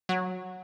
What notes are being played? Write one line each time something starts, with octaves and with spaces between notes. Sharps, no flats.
F#3